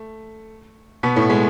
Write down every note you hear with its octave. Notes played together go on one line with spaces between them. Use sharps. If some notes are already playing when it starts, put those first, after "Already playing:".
Already playing: A3
B2 B3
A2 A3
G#3